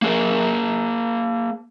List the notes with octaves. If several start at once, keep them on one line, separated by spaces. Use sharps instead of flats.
A#3 G#4 A#4